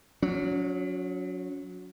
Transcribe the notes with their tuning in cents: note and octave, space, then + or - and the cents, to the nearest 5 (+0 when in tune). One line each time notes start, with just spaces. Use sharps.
F#3 -20 C#4 +35